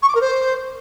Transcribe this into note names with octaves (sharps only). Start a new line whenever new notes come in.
C#6
D6
A#4
C5